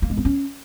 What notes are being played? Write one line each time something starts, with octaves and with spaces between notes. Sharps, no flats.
A#3
G#3
C4
C#4